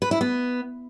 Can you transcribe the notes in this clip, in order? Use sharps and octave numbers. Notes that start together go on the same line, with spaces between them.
B4
E4
B3